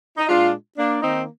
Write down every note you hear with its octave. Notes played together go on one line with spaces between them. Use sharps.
D#4
A#2 G#3 D4 F4
A#3 D4
D#3 A#3 C4 D#4